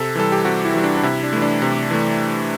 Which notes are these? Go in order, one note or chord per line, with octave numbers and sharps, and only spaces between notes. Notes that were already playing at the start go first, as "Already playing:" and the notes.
Already playing: C3 A4
E3 G3 A4
G4
C3 F#4
E4
E3 G3
D4
D4
C3 E4
D4
E3 A3
D4
C3
E3 A3